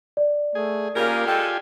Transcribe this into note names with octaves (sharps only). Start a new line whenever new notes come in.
D5
A3 G#4
C#3 A#3 F4 G4 A#4 G#5
G#3 A4 G5